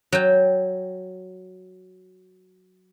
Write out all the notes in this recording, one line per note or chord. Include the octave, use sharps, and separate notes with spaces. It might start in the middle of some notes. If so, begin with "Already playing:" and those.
F#3 G5